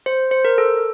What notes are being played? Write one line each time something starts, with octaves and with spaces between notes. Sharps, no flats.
C5
C5
A#4
A4